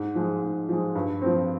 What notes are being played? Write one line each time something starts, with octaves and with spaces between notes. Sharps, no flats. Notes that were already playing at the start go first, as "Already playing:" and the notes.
Already playing: G#2
F3 G#3
G#2
F3 G#3
G2
F3 C4